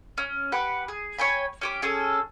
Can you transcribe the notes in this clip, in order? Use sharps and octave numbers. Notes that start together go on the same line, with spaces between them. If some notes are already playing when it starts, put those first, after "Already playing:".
C#4
G4 B4 F#5
G#4
C#5 G5 G#5 B5
C#4 G4 D6
C#4 G#4 A4